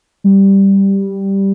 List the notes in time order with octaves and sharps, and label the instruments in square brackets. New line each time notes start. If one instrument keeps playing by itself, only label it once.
[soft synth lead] G3